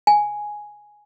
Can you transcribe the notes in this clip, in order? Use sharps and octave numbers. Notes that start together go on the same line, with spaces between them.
G#5